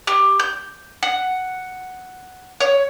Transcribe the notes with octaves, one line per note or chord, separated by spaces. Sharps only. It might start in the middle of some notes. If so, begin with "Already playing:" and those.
G4
G6
F#5
C#5